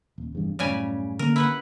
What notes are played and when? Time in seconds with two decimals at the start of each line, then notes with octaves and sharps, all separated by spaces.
0.18 D#1
0.32 F1 E2 G2
0.59 F#2 A2 C#3 G3 G#5
1.19 D3 A#3 A#4
1.36 E4 B4 F#5